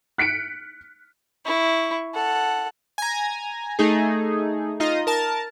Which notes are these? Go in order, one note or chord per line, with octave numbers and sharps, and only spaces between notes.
F#6 B6 C#7 D7
E4 C#6
A4 F#5
G#5 A#5
A3 D#4 G#4
D#4 F4 D#5
A#4 A5